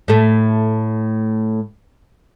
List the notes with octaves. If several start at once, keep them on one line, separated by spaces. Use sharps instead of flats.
A2 A3